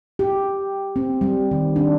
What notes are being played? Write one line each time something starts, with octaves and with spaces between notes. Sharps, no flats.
G4
C4
G3
D#3
D4